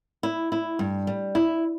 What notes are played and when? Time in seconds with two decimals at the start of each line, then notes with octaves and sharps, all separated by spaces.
0.23 E4
0.52 E4
0.79 G2
1.07 G3
1.35 E4